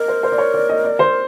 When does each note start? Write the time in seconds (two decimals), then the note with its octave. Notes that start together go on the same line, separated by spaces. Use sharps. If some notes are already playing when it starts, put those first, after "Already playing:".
Already playing: A#4 D#5
0.08 C5
0.23 C5
0.32 D5
0.38 C#5
0.54 D5
0.69 D#5
0.84 D5
0.99 C5